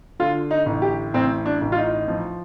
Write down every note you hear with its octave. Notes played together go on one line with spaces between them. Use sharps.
D3 F4
D#4
A1
G4
A1 C4
D4
A1
F4
D#4
F3